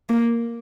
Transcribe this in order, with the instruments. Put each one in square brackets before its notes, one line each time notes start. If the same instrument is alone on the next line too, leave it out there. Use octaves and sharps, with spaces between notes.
[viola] A#3